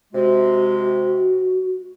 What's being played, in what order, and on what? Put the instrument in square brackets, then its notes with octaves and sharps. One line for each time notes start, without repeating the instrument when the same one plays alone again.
[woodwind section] C3 G#3 [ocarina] F#4